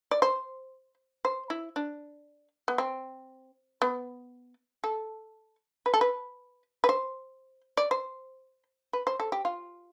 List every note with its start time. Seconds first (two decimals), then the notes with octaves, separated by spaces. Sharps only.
0.11 D5
0.22 C5
1.25 C5
1.50 E4
1.76 D4
2.68 B3
2.78 C4
3.82 B3
4.84 A4
5.86 B4
5.94 A4
6.01 B4
6.84 B4
6.89 C5
7.77 D5
7.91 C5
8.93 B4
9.07 C5
9.20 A4
9.32 G4
9.45 F4